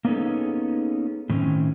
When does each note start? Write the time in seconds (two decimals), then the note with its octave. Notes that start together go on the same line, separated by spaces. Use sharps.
0.05 A#3 B3 C#4 D#4 G#4 A4
1.30 A2 D#3 C4 C#4